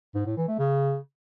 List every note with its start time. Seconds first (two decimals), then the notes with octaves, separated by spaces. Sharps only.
0.15 G#2
0.26 A2
0.37 E3
0.48 A3
0.59 C#3